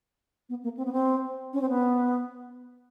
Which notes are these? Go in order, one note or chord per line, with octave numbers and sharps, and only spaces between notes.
B3
A#3
C4
B3
C4
C#4
C4
B3